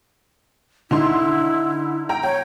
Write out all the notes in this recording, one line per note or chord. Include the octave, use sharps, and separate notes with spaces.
D3 D#4 E4 C6
G5 A#5
C#5 G5